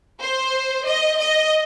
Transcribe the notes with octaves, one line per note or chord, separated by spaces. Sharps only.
C5
D#5
D#5